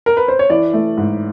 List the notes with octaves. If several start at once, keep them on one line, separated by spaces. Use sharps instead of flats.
A#4
B4
C5
C#5
E3 D5
A3
G#2